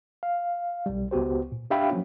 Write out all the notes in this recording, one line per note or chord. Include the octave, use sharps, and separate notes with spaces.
F5
B1 G3
C#2 B3 F#4 G4 C5
A#2
D4 G4 E5 F5 G5 B5
F3 F#3 A#3 C#4 F#4 C#5